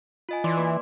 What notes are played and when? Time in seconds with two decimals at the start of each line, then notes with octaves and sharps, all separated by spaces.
0.29 F4 D#5 G#5
0.44 E3 D5 C6 D6
0.57 A#3 B4